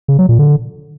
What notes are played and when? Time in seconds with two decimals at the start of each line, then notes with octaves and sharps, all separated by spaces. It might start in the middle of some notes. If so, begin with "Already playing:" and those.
0.08 C#3
0.19 F#3
0.29 A#2
0.39 D3